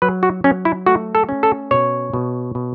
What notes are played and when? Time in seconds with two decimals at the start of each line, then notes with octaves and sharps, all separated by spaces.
0.02 F#3 B4
0.23 F#4
0.44 F#3 C#4
0.65 E4
0.86 A3 F#4
1.15 A4
1.29 C#4
1.43 A4
1.71 B2 C#5
2.13 B2
2.55 B2